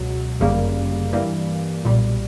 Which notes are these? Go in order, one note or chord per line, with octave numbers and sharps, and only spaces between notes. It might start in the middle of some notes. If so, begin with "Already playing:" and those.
Already playing: C#2 B2 F#3
G1 F#2 C#3 G3 A#3
G2 E3 G3 A#3
B1 A#2 G3